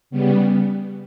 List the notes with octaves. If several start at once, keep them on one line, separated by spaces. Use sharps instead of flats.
C#3 G3 B3